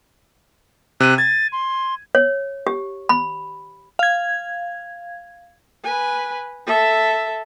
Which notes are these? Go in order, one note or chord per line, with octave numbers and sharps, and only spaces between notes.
C3 F#6 D#7
G#6 A6
C6
C#5
G4
B5
F5 G#6
B4 G#5
A4 E5